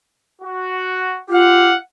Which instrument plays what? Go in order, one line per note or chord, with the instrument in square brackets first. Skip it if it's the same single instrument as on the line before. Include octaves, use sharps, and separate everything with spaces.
[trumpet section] F#4
[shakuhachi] F4 [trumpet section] G4 F5 F#5